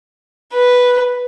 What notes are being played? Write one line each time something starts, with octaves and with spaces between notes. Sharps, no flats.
B4